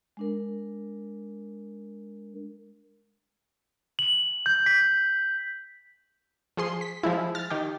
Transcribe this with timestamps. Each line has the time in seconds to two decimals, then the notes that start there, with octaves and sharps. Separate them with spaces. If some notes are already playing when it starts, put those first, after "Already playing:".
0.17 G#3 D4 A#4
3.99 F#7
4.46 G6
4.66 B6
6.57 F3 G#4 C6
6.81 B6
7.03 F3 G#3 E4
7.35 F6 A6
7.50 D#3 G4